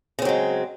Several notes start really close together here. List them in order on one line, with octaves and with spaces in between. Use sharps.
C#3 C4 F#3 G#3